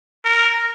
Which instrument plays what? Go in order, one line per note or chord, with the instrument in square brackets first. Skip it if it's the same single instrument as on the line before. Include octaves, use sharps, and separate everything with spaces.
[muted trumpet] A#4